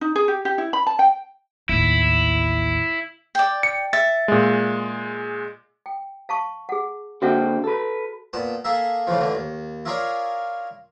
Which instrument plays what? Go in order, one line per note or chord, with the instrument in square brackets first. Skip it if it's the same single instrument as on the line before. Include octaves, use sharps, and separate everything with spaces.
[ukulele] D#4
G#4
G4
G4
E4
B5
A5
G5
[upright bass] A1 D#2 [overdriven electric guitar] E4
[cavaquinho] D5 G5
[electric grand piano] C#7
[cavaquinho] E5 [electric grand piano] A6
[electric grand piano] A#2 G#3
[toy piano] G5
F5 A5 C#6
G#4 F#5
[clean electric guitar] D3 A#3 C4 [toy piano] F#4 E5 F#5
[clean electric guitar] A4 B4
[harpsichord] A#2 B3 A5
A#3 G#4 A4 E5
A2 C#3 E3 F3
A2 D3 E3
D#2
E4 F4 G#4 A#4 C#5 D5